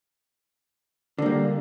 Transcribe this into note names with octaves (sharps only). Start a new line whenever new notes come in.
D3 G3 A#3